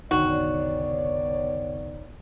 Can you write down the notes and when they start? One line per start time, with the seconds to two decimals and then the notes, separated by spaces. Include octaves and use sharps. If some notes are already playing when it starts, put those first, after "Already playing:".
0.11 F1 B1 D3 D#3 B3 F#4 C#5 D5